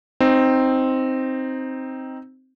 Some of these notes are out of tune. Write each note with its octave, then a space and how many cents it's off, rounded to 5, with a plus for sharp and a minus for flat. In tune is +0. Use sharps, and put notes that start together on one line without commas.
C4 +0 D#4 +0